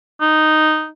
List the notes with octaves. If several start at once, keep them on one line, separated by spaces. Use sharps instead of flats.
D#4